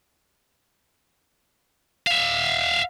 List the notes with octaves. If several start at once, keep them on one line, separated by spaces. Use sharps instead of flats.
E5 F5